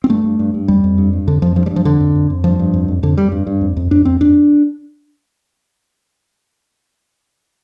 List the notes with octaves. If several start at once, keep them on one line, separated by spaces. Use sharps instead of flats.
C4
G2 A3
G2
G2
G2
F2 G3
F2
G2
G2
F2 D3
F2 F3
G2 F3
G3
G2
F3
F2 D3
F2
F2
F2
G2 F3
G2
F2
F2
F2 D3
F2 G3
G2
G2
F2
F2
F2 D4
F2 C4
F2 D4